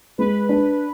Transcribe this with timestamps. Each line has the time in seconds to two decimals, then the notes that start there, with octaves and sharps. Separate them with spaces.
0.18 G#3 B4
0.49 D4